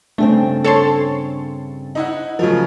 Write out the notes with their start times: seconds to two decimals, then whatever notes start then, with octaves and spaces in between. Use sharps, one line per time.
0.18 G2 C#3 A3 C4 D4
0.64 A4 C#5 C6 A6 C#7
1.95 D#4 E4 F#5
2.39 C#3 F3 F#3 F#4 A#4